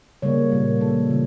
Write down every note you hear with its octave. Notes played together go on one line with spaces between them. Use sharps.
C#3 G3 A#3 C#5
A#2 G3 A#3
C#3 F3 A3 A4
C#3 E3 A3